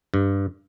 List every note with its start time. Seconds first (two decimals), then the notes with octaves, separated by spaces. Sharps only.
0.14 G2